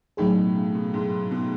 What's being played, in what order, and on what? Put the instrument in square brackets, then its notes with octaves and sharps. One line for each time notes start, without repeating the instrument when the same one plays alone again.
[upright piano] A2 [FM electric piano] F#3 A3 D#4 G#4
[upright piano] B2
C#3
B2
G#2
B2